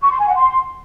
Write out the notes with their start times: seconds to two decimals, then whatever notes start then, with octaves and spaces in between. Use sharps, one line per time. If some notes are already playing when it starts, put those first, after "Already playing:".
0.02 C#6
0.11 C6
0.19 G#5
0.27 F#5
0.36 C6